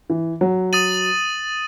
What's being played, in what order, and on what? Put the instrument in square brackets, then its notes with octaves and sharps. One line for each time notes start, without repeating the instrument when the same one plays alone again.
[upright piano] E3
F#3
[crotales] D#6 A6 D#7 F#7